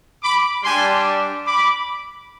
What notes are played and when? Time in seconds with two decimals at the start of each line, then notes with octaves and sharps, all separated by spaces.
0.23 B5 D6
0.63 G3 D4 G4 G#5 C6
1.45 B5 D6